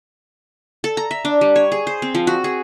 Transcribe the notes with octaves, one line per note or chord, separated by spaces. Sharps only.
A4
A#5
E5
D4
G3
C#5
G#4
C5
C4
F3
F#4
G#4